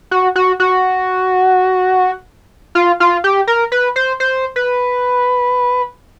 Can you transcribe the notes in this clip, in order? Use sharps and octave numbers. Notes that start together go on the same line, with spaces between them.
F#4
F#4
F#4
F4
F4
G4
A#4
B4
C5
C5
B4